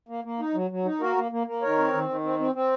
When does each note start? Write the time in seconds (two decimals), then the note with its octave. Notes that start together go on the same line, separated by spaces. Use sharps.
0.09 A#3
0.24 A#3
0.40 D#4
0.54 F#3
0.71 F#3
0.85 D#4
1.00 A#3 F#4 A#4
1.17 A#3
1.32 A#3
1.47 A#3
1.62 D#3 A#4 C#5
1.78 C4
1.93 D#3
2.09 D#3
2.24 C4
2.39 C4
2.55 C4